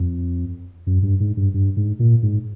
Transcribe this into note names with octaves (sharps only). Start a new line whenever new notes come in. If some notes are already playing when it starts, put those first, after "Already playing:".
Already playing: F2
F#2
G2
G#2
G2
G2
G#2
A#2
G#2